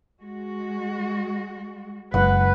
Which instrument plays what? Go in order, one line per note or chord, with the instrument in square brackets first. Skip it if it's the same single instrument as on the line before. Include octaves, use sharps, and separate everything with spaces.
[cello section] G#3 F#4
[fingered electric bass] F#1 [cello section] G#3 [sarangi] B4 [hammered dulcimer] F#5